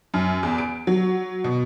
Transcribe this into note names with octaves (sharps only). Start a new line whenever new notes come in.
F#2
E2
D7
F#3
B2